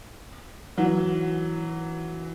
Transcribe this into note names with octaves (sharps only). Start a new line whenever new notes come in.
E3 F#3